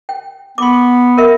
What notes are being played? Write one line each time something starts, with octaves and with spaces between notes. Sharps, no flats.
G5
B3 C6 D6
A#4 E5